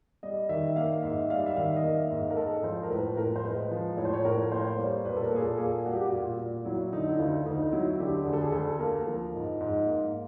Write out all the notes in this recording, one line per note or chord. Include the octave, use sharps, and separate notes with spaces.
G3 D#5
D#3 E5
A#3 F5
G#2 E5
G3 F5
E5
D#3 F5
D#5
A#3 E5
G#2
A#4
G#3 A4
F3 C5
A#4
A2 B4
A2 A#4
C5
G#3 B4
F3
A2 C#5
C5
C#5
A2 A#4
A#3 C5
G3 C#5
A#2 B4
A4
A#4
A#2 G#4
A4
A#3 G#4
G3 F#4
G4
F#4
A#2 F4
A#2
F#3 E4
D3 D#4
E4
D2 F4
D2 D#4
F#3 E4
D3 G4
D2 G#4
A4
G#4
D2 A4
A4
A#3 A#4
F3
G#2
G#2
A#3